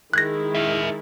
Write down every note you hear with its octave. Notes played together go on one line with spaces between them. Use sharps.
D#3 G#3 E4 F#6 G#6 A#6
A#4 E5